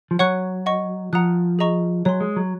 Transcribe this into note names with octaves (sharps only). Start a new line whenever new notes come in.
F3
F#3 C#5 F#5 C#6 F#6
D#5 F#5 C#6
F3 F#5 A#5 D#6 F#6
G#4 D#5 A#5 C#6
F#3 C#5 G#5 C6
G#3
F#3